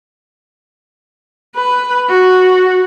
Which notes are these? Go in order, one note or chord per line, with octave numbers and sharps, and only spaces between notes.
B4
F#4